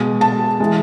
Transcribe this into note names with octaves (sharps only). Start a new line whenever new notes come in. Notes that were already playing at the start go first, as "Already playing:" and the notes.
Already playing: B2 G#3
A5
E3 G#3